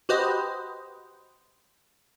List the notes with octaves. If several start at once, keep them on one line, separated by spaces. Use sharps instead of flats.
F#4 G4 B4 C5 D#5